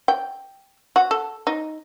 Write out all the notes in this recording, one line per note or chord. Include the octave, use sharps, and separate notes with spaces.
G5
F#4
A4
D#4